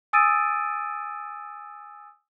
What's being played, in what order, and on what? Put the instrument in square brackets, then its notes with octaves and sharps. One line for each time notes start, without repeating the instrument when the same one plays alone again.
[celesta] G#5 D#6 E6 A6 D7 D#7